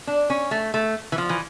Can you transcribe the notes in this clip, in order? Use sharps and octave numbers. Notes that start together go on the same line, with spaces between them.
D4
C#4
A3
A3
E3
F3
E3